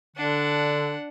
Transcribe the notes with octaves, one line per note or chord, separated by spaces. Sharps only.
D3 D4 F#5